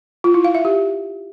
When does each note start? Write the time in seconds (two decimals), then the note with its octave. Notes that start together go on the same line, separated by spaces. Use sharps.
0.24 F4
0.34 E4
0.44 F5
0.55 E5
0.65 G4